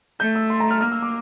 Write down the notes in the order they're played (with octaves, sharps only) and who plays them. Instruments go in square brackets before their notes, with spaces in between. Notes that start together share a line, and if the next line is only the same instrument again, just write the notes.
[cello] A3 [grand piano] G6
[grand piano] E6
C6
A#5
F6
[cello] A#3 [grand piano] F6
[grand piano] E6
D6